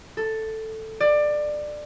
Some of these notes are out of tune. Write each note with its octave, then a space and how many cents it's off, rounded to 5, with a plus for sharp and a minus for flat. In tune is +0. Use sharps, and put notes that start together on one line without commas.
A4 +5
D5 +20